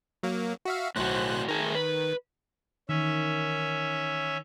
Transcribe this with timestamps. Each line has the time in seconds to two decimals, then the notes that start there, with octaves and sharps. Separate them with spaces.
0.23 F#3 A#3
0.65 F#4 E5 F5
0.96 B1 A2 F#4 C5 F#6
1.48 D#3 A3 G#4 A#4
1.75 B4
2.89 D#3 E3 C#4 E5